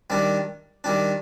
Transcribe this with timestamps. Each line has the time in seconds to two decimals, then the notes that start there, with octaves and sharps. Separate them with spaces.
0.10 D#3 G3 D4
0.84 D#3 G3 D4